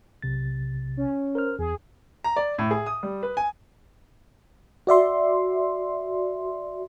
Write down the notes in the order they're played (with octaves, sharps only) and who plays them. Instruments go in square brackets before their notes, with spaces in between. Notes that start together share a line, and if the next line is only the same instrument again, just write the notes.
[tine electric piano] B1 C3 A6
[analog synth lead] C#4
[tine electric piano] A#4 C5 F6
[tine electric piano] E2 [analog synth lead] G#4
[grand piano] A#5
D5
A2
G#4
D#6
G3
B4
G#5
[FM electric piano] F#4 D5 E5 C6